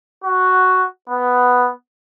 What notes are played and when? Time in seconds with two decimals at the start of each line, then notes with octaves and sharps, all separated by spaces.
0.24 F#4
1.10 B3